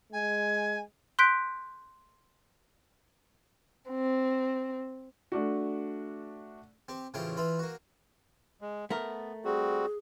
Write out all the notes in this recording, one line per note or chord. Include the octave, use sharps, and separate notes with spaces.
G#3 G#5
C6 F#6 G6 B6 D7
C4
A3 D4 F#4
C4 G4
A1 A2 C#3 F3 E4 G5
E3 F4 E5 B5
A#3 F#4
G#3
A3 B3 A#4
G3 C4 F#4 G#4